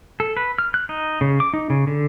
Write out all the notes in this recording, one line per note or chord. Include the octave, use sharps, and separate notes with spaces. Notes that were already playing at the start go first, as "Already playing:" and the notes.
A4
B4
F6
F#6
D#4
C#3
D6
D#4
C#3
D3